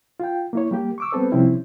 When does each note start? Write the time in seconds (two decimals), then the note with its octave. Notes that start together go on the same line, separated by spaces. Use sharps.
0.20 F4 G5
0.53 A#3 E4 C#5
0.71 G3 A#3 G4
0.98 C#6 D6 E6
1.12 G3 B3 C4 A4 B4 C5
1.32 C3 F3 G3 C4 C#4 E4